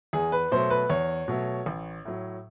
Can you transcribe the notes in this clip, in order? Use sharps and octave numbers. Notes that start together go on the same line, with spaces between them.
E2 G#4
B4
B2 F#3 A3 C5
B4
E2 C#5
B2 F#3 A3
A1
A2 F#3